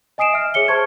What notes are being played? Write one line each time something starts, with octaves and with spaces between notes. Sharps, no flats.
D#5 G#5 D#6 C7 D7 E7
E5 F6
G#4 C#5 C#7 G7
C5 A5 C6 C#6 F6 G#6